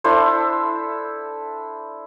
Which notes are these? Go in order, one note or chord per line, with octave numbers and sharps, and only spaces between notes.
D4 E4 A4 C5